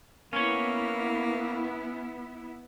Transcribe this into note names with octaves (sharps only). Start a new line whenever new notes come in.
A#3 B3 C#4 E4 C#5